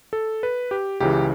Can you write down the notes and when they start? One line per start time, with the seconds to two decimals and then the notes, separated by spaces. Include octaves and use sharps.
0.13 A4
0.43 B4
0.71 G4
1.00 C#2 C#3 E3 G4